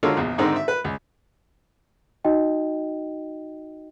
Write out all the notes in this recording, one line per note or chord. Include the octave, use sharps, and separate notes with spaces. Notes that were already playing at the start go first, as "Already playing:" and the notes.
D3 G#3 F4 A4 A#4 C#5
A#1 E2
G#2 D3 D#3 G#3 C4 D#4
E5
B4
C#2
D#4 F#4 D#5 G5